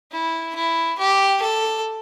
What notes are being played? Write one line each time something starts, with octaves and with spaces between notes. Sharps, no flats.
E4
E4
G4
A4